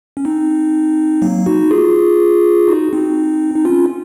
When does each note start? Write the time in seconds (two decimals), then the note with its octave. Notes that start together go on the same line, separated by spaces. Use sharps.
0.17 C#4
0.25 C4 D#4
1.22 F#3 A#3
1.46 D#4 F#4
1.71 F4 G#4
2.68 D#4 F#4
2.92 C4 D#4
3.55 D#4
3.65 C#4 F4